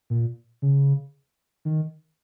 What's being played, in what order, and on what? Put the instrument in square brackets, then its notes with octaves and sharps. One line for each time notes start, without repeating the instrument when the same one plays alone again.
[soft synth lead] A#2
C#3
D#3